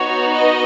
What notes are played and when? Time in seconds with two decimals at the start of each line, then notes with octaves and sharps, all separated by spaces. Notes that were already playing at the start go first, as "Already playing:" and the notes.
Already playing: B3 D#4 F#4 C#5
0.34 D#5